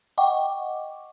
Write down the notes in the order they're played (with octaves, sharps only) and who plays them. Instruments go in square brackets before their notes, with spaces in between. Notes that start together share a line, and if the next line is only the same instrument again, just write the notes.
[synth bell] D#5 F#5 G5 C#6 D6